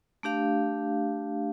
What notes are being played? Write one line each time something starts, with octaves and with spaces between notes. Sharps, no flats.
A3 D4 G4 F5